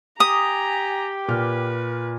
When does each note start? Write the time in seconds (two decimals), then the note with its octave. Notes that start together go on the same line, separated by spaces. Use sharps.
0.20 G4 G#5 A#5 D#6
1.28 A#2 B4 F6